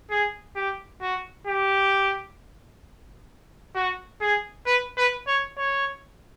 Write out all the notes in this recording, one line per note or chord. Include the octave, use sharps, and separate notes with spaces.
G#4
G4
F#4
G4
F#4
G#4
B4
B4
C#5
C#5